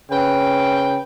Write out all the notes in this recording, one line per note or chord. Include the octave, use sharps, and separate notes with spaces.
C#3 B4 G5